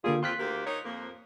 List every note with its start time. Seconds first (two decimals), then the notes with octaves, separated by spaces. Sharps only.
0.04 D3 G3 A#3 F4 G#4
0.23 F2 C4 F4 C6 F#6 B6
0.39 D2 A#3 G4
0.66 D#4 A#4 C#5
0.84 F2 F3 A#3